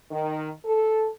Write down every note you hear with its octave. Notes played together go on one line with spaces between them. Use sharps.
D#3
A4